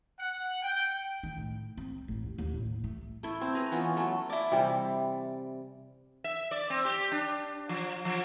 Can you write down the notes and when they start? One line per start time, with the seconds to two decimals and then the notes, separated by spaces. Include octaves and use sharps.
0.19 F#5
0.63 G5
1.23 D#3
1.37 A2
1.78 C4
2.08 A1
2.23 D#2
2.38 D#2
2.54 A2
2.84 A3
3.23 A3 E4
3.41 C4
3.55 G#4 B4 A#5
3.71 E3 B3 C#4 F4
3.97 F#3 A3
4.30 E4 D5
4.52 C3 E3 G3
6.24 E5
6.51 D5
6.70 C4
6.85 G4
7.12 D4
7.69 F3
8.05 F3